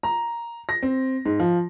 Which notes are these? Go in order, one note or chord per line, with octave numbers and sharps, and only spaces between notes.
A#5
A#6
C4
G#2
F3